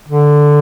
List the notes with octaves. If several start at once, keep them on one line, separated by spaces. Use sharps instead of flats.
D3